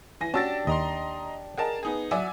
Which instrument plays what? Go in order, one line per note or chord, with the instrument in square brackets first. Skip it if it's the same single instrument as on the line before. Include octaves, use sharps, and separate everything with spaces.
[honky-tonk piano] E3 G#5 A#6
[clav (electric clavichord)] C#4 F#4 [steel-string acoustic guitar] D4 G4 [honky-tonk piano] A5 E6 A6
[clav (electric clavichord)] D#2 [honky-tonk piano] D#5 A#5 C6
[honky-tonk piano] G#4 A#4 A5 [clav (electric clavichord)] D#5 F#5
[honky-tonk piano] B3 D#4 G#4
[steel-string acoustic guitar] F#3 [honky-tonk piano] D5 E5 G#5